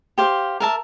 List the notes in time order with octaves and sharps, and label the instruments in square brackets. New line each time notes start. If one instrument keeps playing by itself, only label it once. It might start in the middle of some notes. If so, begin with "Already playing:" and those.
[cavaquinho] G4 C5 F5
A#4 E5 A5